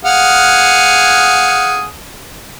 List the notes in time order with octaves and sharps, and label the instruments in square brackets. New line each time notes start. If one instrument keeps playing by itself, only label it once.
[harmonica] G#4 F5 F#5